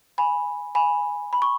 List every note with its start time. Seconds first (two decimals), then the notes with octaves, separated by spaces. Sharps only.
0.18 G#5 B5
0.75 G#5 B5
1.33 B5
1.42 C#6